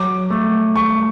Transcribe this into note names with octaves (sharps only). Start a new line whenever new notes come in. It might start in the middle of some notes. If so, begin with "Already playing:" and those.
Already playing: F#3 D6
A3
A3 C#6